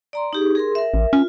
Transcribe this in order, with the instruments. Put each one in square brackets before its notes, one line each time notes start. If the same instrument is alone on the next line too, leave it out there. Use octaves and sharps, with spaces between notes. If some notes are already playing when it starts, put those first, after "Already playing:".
[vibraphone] D5 A#5 C6
D#4 G4 G#4
G#4 A#4 C6
A#4 E5
[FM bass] A1
[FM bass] C#4 [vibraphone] F4